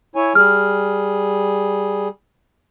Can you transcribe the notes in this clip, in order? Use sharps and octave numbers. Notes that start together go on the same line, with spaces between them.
E4 C#5 G#5
G3 G#4 F6